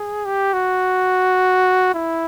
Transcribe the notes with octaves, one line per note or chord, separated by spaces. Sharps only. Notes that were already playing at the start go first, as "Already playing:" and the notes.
Already playing: G#4
G4
F#4
E4